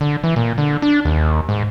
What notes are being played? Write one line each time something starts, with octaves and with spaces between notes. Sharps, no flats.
D3
E3
A#2
D3
D4
D#2
G#2